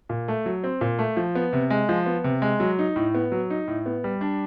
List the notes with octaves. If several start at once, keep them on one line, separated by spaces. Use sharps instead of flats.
A#2
A3
F#3
C4
A#2
A3
F3
B3
C3
G#3
F3
B3
C3
G#3
F#3
D#4
A2
B3
F#3
D#4
A2
B3
G3
D4